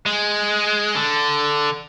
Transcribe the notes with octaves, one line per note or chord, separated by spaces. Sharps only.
G#3
D3